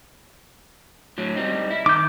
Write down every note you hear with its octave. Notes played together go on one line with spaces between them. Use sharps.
A2 F#3
G3 C4 D#4
E4
D#3 D6 G6